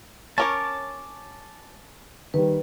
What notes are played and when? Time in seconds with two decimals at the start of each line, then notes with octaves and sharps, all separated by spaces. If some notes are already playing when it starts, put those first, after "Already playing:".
0.38 C#4 A#4 C#5 A5 D6
2.34 D#3 G3 B4